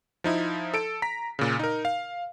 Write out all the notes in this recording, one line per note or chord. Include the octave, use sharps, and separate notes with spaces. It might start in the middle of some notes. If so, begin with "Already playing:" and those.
F3 D#4 E4
A4 D7
A#5 B6
A#2 C#3
D#4 A#4
F5